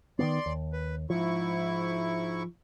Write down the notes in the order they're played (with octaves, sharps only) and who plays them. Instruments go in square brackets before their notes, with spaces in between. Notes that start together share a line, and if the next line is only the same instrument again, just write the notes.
[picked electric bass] D#3 E3 B3 [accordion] D5 C6
[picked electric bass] D#2
[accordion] B4
[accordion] G#2 E4 C#6 [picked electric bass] F3